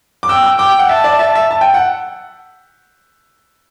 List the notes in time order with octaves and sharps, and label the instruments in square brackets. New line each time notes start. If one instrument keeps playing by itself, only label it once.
[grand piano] D6
[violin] G5 [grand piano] E6
[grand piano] E6
[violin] G5 [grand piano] D6
[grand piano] F#5
[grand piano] E5 [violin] A5
[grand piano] D5
E5
E5
A5
G5
F#5